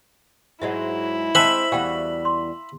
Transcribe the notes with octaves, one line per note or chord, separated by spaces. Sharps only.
G#2 F#3 G#3 E4 E5
G#3 C4 C5 E5 G5 A5 B5
E2 G3 F#4 F5 G5
C6